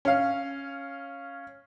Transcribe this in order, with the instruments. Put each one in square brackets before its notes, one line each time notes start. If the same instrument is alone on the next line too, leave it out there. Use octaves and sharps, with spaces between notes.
[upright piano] C#4 F5